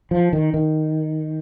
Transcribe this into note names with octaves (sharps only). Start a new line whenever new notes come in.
F3
D#3
D#3